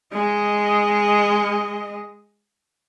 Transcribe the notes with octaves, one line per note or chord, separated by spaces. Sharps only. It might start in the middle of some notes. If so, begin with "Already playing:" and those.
G#3 D#5